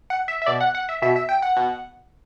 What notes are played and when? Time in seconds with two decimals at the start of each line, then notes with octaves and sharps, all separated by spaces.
0.10 F#5
0.28 E5
0.42 E5
0.46 B2 D5
0.61 F#5
0.75 F#5
0.89 E5
1.02 B2 E5
1.16 E5
1.29 G5
1.42 F#5
1.57 B2